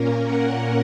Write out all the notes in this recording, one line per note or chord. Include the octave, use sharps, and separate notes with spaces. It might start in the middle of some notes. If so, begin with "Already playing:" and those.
Already playing: A#2 A#3 C#4 A#4
F#5